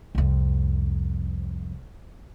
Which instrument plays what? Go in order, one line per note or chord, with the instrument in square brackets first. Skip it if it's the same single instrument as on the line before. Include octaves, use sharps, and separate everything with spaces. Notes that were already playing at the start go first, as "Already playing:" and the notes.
[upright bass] C2 F2